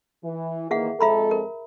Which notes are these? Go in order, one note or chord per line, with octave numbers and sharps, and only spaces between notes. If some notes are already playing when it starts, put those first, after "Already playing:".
E3
D#3 E3 A#3 G#4 E5 F#5
F2 G#3 A4 E5 A#5 B5
A#4